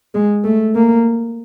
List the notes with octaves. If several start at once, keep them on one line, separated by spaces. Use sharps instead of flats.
G#3
A3
A#3